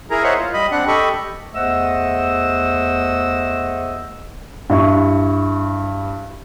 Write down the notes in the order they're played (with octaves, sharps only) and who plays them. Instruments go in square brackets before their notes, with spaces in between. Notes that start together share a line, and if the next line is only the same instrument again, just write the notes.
[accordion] E4 G#4 A#4 A#5
C5 C#5 D#5 E5 F#5 C6
F4
G3 D#5 B5
C4 D4 F#5
G4 A4 D#5 B5 C#6
[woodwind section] E2 A3 C5 D#5 F#5 E6
[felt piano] G2 E4 C#6